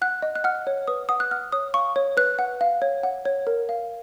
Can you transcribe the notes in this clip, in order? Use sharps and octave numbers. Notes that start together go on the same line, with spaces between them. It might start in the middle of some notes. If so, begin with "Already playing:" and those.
F#5 F#6
D#5
F#6
F#5 F6
C#5
B4 D#6
F#5 D#6
F#6
F#5 F6
C#5 D#6
F5 C#6
C#5
B4 F#6
F#5
F5
C#5
F#5
C#5
A#4
F5